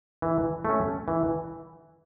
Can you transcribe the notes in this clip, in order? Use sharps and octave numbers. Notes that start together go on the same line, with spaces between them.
E3
A3 C#4
E3